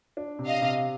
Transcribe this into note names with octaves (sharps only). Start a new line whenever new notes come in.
D4
C3
D#5 F5
C3